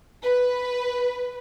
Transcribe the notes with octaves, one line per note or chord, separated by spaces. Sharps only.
B4